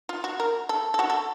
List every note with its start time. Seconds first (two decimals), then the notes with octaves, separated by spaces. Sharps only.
0.09 F4
0.24 F#4
0.40 A#4
0.69 A4
0.94 A4
0.99 F#4
1.10 A4